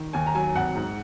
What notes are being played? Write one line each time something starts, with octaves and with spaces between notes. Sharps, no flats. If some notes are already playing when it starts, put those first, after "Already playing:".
Already playing: D#3
D#2 G#5
A#5
F#3 G#5
G#1 F#5
G#2